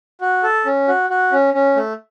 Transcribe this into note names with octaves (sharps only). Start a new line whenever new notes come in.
F#4
A4
C#4
F#4
F#4
C#4
C#4
A3